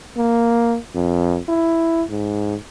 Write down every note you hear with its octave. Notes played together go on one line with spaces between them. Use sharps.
A#3
F2
E4
G#2